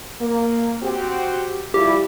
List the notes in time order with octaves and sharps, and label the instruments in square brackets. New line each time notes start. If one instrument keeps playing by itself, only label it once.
[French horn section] A#3
C4 F#4 G4
[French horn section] F3 G3 E4 [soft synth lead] G4